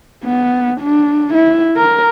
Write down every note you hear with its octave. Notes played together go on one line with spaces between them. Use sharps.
B3
D4
E4
A#4